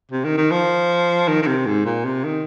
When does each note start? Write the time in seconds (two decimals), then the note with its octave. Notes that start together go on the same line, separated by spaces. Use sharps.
0.12 C3
0.25 D#3
0.37 D#3
0.51 F3
1.28 D#3
1.42 D#3
1.47 C3
1.66 G#2
1.85 A#2
2.05 C3
2.24 D#3